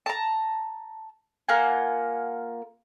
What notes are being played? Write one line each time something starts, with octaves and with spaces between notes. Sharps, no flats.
A5 A#5
A#3 F4 F#5 G#5